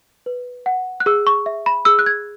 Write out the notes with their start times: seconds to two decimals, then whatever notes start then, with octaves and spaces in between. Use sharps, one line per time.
0.26 B4
0.66 F#5
1.00 F#6
1.06 G#4 E6
1.27 C#6
1.46 E5
1.66 B5
1.85 G#4 E6
1.99 F#6
2.06 G#6